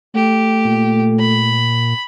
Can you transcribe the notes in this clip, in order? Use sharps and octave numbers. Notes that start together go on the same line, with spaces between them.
A3 G4
A#2
B5